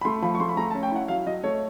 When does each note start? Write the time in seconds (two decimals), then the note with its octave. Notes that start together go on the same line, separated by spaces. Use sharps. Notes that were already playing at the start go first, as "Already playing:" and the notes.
0.01 B5
0.05 A3 C6
0.22 F3 B5
0.35 C#6
0.40 A3 C6
0.49 B5
0.57 A3 A#5
0.71 A5
0.74 C#4
0.83 G5
0.91 E4 F#5
1.08 F#3 F5
1.26 F#3 D#5
1.43 A3 C#5